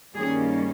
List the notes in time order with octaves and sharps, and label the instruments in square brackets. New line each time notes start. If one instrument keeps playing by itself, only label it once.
[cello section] G2 D#3 G3 A#3 C#4 G#4